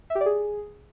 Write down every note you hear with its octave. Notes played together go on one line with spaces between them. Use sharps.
E5
G4
D5
G#4